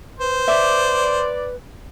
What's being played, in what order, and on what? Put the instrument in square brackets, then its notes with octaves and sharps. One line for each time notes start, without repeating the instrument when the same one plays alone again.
[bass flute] B4 [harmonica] C5
[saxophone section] D5 [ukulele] E5